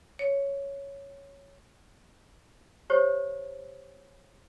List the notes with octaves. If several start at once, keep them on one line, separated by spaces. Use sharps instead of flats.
C#5
G4 C5 C#5